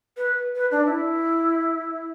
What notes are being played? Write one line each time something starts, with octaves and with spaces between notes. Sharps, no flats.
B4
B4
D4
E4